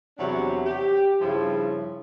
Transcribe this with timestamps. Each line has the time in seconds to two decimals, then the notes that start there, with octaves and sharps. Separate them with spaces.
0.18 E2 C3 F#3 D4 E5
0.65 G4
1.21 G2 C#3 F3 E4